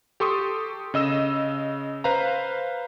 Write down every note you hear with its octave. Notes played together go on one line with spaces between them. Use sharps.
G4 A4 C6 C#6 D#6
C#3 D#5 E6 E7
B4 C5 F5 A#5